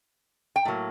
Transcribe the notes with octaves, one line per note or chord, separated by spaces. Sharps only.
G5
A2 F#3 A#3